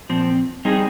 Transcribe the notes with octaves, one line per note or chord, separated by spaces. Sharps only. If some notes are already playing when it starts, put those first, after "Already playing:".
A#2 F3 C4
G3 C4 D#4 G#4